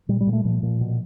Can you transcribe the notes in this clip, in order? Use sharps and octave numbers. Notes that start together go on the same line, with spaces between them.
A#2 G3
G3
A#2
A3
A#2 F3
A#2
B2